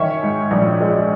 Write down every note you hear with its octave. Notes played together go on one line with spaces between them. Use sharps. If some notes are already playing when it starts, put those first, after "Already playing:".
Already playing: D#3 C#4 C#5 E5
G#2
A#1
G#3